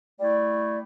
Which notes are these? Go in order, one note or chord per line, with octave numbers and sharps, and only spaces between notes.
G3 A3 E4 D5